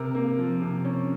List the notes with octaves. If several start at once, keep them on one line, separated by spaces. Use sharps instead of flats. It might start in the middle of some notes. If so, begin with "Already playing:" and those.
Already playing: C3 A#4
A#3
F3
C3
C#4